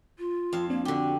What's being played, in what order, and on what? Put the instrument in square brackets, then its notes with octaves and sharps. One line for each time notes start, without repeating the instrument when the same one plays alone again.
[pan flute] F4
[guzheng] F2 F5
[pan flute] A#3 [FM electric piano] C4 D4
[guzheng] D3 G4 [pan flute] F#4